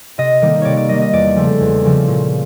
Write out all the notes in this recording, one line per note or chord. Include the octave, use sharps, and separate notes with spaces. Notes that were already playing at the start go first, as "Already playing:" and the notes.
C3 D#5
D#3 G3 A#3
C3 C#5 D5
D5
D#3 G3 A#3 D#5
D#5
E2 D5
C#3 F3 A3 C4
E2
C#3 F3 A3 C4
A#2